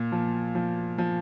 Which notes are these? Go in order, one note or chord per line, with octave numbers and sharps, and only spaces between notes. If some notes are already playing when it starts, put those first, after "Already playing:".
Already playing: A#2
F3
F3
F3